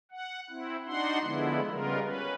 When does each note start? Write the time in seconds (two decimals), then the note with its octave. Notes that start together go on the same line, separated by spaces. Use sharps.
0.11 F#5
0.50 C4 E4
0.87 D4 D#4 F#4 F#5 C6
1.22 D3 F3 G#3 B3 E4
1.70 C#3 G3 G#3 B3 F4 A#4
2.02 C#4 B4